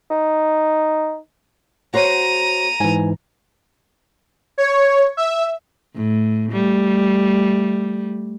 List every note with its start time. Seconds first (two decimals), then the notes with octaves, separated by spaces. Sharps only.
0.10 D#4
1.94 F#4 C5 C#5 A#5 D#7
2.80 G#2 E3 G#5
4.58 C#5
5.17 E5
5.95 A2
6.52 G3 A3